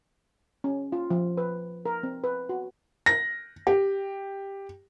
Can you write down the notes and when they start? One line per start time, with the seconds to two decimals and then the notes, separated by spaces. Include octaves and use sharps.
0.64 C#4
0.92 F4
1.10 F3
1.37 B4
1.86 A#4
2.03 C4
2.24 B4
2.49 F#4
3.06 A#6
3.67 G4